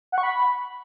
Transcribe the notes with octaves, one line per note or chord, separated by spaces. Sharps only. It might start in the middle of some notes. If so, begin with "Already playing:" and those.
F#5
C#6
B5